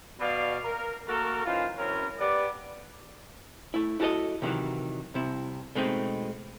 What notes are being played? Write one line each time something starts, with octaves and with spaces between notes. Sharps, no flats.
B2 D5 F5
A#4
A3 A#3 F#4 A4 A#4
E3 C#4 D#4 F4 C5 F5
F#2 E3 C4 C#4 A#4 B4
B3 G4 B4 D5
A3 E4
E4 F#4 A4 D5 D#5
C3 D#3 E3 F#3
C2 C3 E4
B2 G#3 A3 C4 D#4